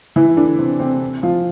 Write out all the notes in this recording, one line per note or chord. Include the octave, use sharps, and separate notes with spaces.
E3 E4
D3 D4
C3 C4
C3 C4
F3 F4